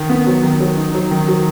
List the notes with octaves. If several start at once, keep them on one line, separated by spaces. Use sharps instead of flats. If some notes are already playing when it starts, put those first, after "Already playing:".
Already playing: D#3
B3
F#3
D#3
F#3
D#4
F#3
D#3
F#3